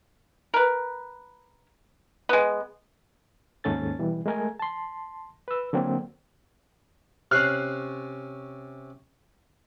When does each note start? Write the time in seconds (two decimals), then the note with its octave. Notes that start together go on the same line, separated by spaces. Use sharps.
0.54 A#4 B4
2.29 G#3 B3
3.64 D#2 G#2 C#4 A4 A6
3.99 B2 E3 G3
4.26 G#3 A3 A#4 G#5
4.59 A5 C6
5.48 B4 E6
5.73 D3 F#3 A#3 C4
7.31 C3 C#4 F6 F#6 C7